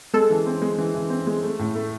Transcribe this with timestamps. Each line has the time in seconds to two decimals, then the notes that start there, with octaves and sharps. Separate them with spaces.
0.14 G#3 A4
0.30 E3
0.46 C4
0.62 G#3
0.78 E3
0.95 E3
1.10 C4
1.27 G#3
1.43 A3
1.59 A2
1.75 A3